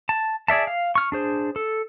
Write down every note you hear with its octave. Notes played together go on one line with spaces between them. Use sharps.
A5
G#4 D5 E5 A5
F5
C#6 F6
D4 G#4 C5
A4